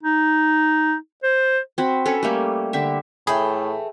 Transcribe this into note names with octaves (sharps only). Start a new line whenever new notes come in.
D#4
C5
C4 F#4 B5
C#4 A4 B4 C#5
G3 A3 A#3 G4
D3 G4 E5
A2 E3 A3 G#4 G5 B5